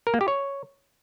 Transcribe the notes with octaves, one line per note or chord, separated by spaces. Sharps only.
A#4
A#3
G4
C#5